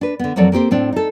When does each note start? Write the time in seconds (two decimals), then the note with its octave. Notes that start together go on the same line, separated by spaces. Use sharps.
0.01 D4 B4
0.19 D3 B3
0.36 F2 F3 F#3 A4 A#4 D5
0.52 A#3 C4 G4 C5
0.71 A2 C4 D4
0.93 D#4 A4